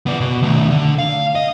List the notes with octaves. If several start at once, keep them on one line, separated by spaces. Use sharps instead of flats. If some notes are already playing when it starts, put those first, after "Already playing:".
B3 D5
B2
D#3 A3
D3
F5
D#5